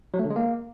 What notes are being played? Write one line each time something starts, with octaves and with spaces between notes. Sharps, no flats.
F#3
A3
D3
G#3
A#3